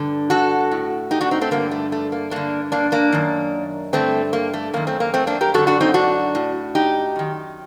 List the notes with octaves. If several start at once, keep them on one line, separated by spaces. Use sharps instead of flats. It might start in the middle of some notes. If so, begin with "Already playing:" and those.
Already playing: G2 D3
F#4 A4
A2
D#4 G4
D4 F#4
C4 D#4
A3 C4
G2 D3 A#3
A3
A3
A#3
G2 D3 A#3 D4
A#3 D4
A#3 D4
F#2 D#3
G2 D3 A3 C4
A#3
A3
F#2 D#3 A#3
A3 C4
A#3
A3 C4
A#3 D4
G4 A#4
F#2 D3 F#4 A4
D4 F#4
C4 D#4
D4 F#4
A2
D#4 G4
F#2 D#3